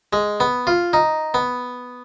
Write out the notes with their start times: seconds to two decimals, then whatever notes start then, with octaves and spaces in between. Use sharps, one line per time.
0.13 G#3
0.40 B3
0.67 F4
0.93 D#4
1.34 B3